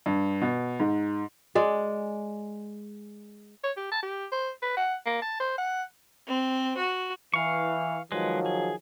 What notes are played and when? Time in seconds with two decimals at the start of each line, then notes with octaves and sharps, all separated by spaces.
0.06 G2
0.41 B2
0.80 G#2
1.55 G#3 D5
3.64 C#5
3.76 G4
3.91 A5
4.03 G4
4.32 C5
4.62 B4
4.77 F#5
5.05 A#3
5.22 A5
5.40 C5
5.58 F#5
6.27 C4
6.77 F#4
7.34 E3 F5 C#6
8.12 D#3 F3 F#3 G#3 B4
8.46 G#4